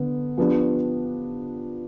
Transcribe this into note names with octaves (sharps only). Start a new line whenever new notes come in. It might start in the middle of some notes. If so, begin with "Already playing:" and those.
Already playing: D3 B3
F3 B3 D4 G4